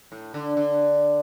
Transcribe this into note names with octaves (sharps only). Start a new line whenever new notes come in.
A2
D3
D3